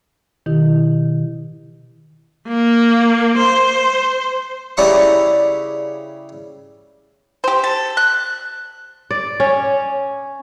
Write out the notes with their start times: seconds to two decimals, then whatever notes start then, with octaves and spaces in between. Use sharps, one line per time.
0.46 B2 D#3 E4 G4
2.48 A#3
3.37 C5
4.77 C#3 G3 E4 D5 A#5 C#6
7.44 G4 C5
7.64 A4
7.97 F#6
9.11 D5
9.40 C#4